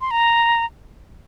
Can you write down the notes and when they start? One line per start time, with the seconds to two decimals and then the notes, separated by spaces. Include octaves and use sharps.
0.01 C6
0.11 A#5